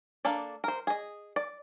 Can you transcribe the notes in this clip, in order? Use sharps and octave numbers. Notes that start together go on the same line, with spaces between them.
A#3 D4 A4 D5
A#4 C5
G#4 D#5
D5